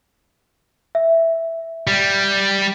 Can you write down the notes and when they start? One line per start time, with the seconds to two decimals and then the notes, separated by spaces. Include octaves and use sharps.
0.95 E5
1.87 G3